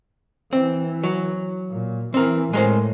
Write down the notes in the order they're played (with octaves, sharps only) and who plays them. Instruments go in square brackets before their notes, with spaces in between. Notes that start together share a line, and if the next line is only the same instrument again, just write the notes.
[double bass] E3 [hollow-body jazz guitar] C4
[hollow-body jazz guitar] F#3
[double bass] A#2
[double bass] E3 [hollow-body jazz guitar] C4 A#4
[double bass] A2 [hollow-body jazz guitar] G#3 A#4 C5